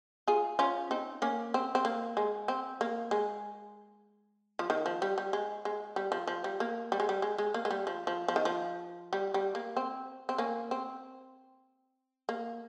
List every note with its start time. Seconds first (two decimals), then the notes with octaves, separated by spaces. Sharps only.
0.28 F4 G#4
0.59 C#4 F4
0.91 C4 D#4
1.22 A#3 C#4
1.54 C4
1.75 C4
1.85 A#3
2.17 G#3
2.48 C4
2.81 A#3
3.11 G#3
4.59 F3
4.70 D#3
4.86 F3
5.02 G3
5.18 G3
5.33 G#3
5.65 G#3
5.96 G3
6.12 F3
6.28 F3
6.44 G3
6.60 A#3
6.92 G3
7.00 G#3
7.09 G3
7.22 G#3
7.38 G#3
7.54 A#3
7.65 G#3
7.71 G3
7.87 F3
8.07 F3
8.28 F3
8.36 D#3
8.45 F3
9.13 G3
9.34 G3
9.55 A#3
9.77 C4
10.29 C4
10.38 A#3 C#4
10.71 C4
12.29 A#3